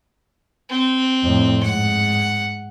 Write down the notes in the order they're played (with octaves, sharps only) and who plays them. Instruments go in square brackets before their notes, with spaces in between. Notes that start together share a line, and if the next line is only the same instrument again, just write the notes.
[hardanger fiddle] C4
[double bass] F2 A2
[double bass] G#2 [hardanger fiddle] F#5